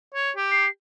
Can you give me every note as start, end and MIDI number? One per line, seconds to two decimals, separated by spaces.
0.15 0.31 73
0.36 0.66 67
0.51 0.69 96